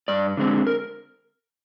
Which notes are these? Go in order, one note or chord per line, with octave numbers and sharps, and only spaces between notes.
G2 D5
D3 G#3 C4
A#4